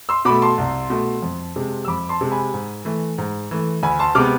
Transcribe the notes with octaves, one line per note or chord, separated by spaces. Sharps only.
C6 E6
B2 A3 B5 D6
A5 C6
C2
B2 A3
F2
C3 G#3
E6
F2 B5 D6
A5 C6
C3 G#3
G#5 B5
G#2
E3 A3
G#2
E3 A3
D2 G#5 B5
A5 C6
C3 G#3 B3 D6 F6